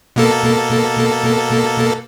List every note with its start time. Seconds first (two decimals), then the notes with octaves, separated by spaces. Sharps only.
0.16 B2 A#3 A4